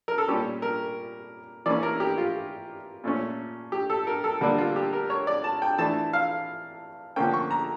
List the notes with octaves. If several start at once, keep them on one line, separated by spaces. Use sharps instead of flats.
A#4
A4
A#2 G3 C#4 G4
A#4
E3 A#3 C#4 D5
A#4
G4
F4
A#2 A3 C#4
G4
A4
A#4
A4
D3 G3 A#3 D4
F4
G4
A#4
C#5
D5
A5
G5
E3 A3 D4 A5
F5
D3 F3 A#3 C#4 G5
C#6
A#5